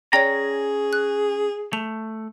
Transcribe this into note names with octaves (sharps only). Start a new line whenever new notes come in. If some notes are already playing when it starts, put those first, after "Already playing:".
C#4 G#4 C#5 D5 G5 A#5
F#6
A3 F7